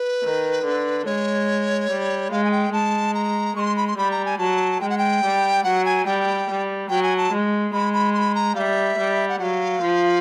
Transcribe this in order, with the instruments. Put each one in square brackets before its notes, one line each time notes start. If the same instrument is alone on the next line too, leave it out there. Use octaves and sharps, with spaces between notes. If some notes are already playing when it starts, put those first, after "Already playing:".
Already playing: [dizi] B4
[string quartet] D#3
D3
[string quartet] G#3 [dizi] C#5
[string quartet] G3
[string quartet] G#3 [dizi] F5
[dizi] G#5
G5
[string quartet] G#3 [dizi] A5
[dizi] A#5
[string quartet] G#3 [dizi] C#6
[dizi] C6
B5
C6
[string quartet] G3 [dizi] B5
[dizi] A#5
G#5
[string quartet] F#3 [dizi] A5
[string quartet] G#3 [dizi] G5
[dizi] F#5
G5
[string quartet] G3
[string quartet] F#3 [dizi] F#5
[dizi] G#5
[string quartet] G3 [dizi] G5
[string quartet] G3
[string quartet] F#3 [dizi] G5
[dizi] G#5
A5
[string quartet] G#3
[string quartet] G#3 [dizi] B5
[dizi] B5
C6
B5
A#5
[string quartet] G3 [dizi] E5 F5
[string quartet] G3
[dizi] F#5
[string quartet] F#3 [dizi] F5 F#5
[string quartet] F3